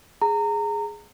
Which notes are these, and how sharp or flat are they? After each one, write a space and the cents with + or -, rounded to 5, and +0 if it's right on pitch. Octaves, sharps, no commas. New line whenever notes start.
G#4 +0 A#5 -25